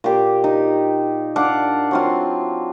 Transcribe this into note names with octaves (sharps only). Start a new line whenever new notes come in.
A#2 G4 D6
D#4
D4 F5 F#5 D6
F#3 C4 F4